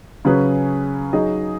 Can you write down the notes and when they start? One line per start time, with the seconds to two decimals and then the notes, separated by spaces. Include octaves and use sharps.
0.25 C#3 F#3 C#4 G#4 B4
1.13 F#3 D#4 G#4 D#5